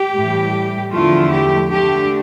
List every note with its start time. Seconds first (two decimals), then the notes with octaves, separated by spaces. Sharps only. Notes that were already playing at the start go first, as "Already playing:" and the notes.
Already playing: G4
0.15 A2 E3 G3
0.92 E2 D3 F3 A3 E4 F4
1.30 G4
1.69 D3 A3 D4 G4